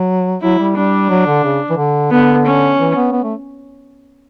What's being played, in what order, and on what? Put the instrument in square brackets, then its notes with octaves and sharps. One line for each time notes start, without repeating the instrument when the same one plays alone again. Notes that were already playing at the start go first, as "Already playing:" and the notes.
Already playing: [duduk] F#3
[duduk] F#3 [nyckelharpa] E4
[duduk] G3
[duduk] G3 [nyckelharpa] D4
[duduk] F#3
D3
C#3
E3
D3
[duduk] D3 [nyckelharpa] B3
[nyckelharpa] C#4
[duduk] E3
B3
B3
A3